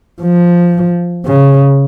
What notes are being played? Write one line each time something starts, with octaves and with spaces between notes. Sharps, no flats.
F3
C#3